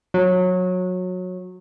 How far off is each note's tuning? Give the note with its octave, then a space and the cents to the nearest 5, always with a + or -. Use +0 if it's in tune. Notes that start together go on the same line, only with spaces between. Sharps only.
F#3 -20